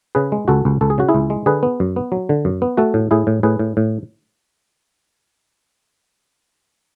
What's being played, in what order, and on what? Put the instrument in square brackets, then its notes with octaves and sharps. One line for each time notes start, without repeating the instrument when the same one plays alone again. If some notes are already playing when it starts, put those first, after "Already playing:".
[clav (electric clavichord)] C#3 G#4 B4
G#3
C#2 F#4 A4
C#2
C#2 A4
G#4
C#3 F#4
E4 G#4
C#2
G#3
D3 G#4 B4
B3
F#2
B3
F#3
D3
F#2
B3
A3 F#4 A4
A2
A2 E4 G#4
A2
A2 G#4 B4
A2
A2